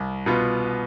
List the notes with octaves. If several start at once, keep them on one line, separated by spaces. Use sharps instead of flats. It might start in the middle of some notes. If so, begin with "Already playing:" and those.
Already playing: C2
B2 B3 F4